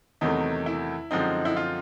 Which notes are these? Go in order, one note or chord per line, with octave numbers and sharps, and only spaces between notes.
E2 C3 D#3 F#3 A3 D#4
E4
F#2 D3 F3 G#3 C4 D#4
E4
F4